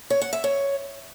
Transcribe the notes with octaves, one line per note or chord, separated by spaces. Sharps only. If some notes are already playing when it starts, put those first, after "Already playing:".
C#5
F#5
E5
C#5